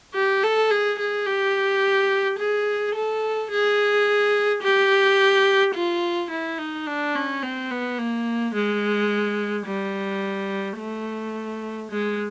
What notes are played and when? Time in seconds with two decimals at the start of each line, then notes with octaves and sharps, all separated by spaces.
0.14 G4
0.43 A4
0.71 G#4
0.99 G#4
1.27 G4
2.38 G#4
2.94 A4
3.51 G#4
4.62 G4
5.75 F4
6.31 E4
6.58 D#4
6.87 D4
7.15 C#4
7.43 C4
7.71 B3
7.98 A#3
8.55 G#3
9.67 G3
10.79 A3
11.91 G#3